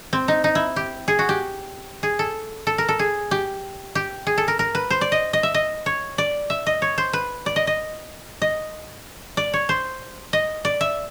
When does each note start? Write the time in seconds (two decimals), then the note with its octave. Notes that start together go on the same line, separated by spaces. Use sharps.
0.13 C4
0.28 D#4
0.44 D#4
0.55 E4
0.76 G4
1.08 G#4
1.19 F#4
1.29 G4
2.03 G#4
2.19 A4
2.67 A4
2.78 A#4
2.88 A4
2.99 G#4
3.31 G4
3.95 G4
4.27 G#4
4.38 A4
4.48 A#4
4.59 A#4
4.75 B4
4.90 C5
5.01 D5
5.12 D#5
5.33 D#5
5.43 E5
5.54 D#5
5.86 C#5
6.18 D5
6.50 E5
6.66 D#5
6.82 C#5
6.98 C5
7.13 B4
7.46 D5
7.56 D#5
7.67 D#5
8.42 D#5
9.37 D5
9.54 C#5
9.69 C5
10.33 D#5
10.65 D5
10.81 E5